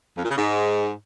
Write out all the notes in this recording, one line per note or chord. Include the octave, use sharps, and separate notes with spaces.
F2
A#2
C#3
G#2